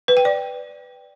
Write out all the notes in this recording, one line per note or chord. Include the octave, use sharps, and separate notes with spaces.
B4
G5
D5